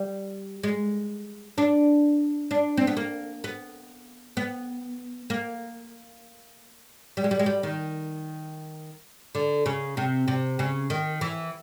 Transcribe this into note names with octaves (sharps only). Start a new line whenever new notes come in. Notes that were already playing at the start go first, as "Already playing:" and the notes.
Already playing: G3
G#3
D4
D4
C4
B3
A#3
B3
B3
A#3
G3
G#3
G3
G#3
G3
D#3
D3
C#3
C3
C3
C#3
D#3
E3